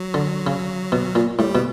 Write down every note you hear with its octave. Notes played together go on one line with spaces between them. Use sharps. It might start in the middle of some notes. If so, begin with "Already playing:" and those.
Already playing: F#3
D3
C#3
B2
A#2
A2 G3
B2